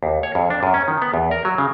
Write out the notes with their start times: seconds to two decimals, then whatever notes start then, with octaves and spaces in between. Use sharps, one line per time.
0.03 D#2
0.23 C#5
0.35 F2
0.50 D4
0.63 F#2
0.74 C#4
0.88 D#3
1.02 B3
1.14 E2
1.31 A#4
1.45 F#3
1.58 C#3